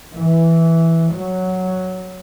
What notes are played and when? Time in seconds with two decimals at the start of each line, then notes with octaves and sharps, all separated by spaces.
0.14 E3
1.12 F#3